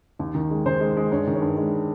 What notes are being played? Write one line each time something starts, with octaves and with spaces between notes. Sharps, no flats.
D#2
D#3
G#3
D#3 C5
G#3
G#3
G2 C#5
D#3
C#5
G2
G#3